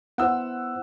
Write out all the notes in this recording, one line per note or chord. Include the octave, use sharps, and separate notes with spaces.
B3 E4 C5 F#5 E6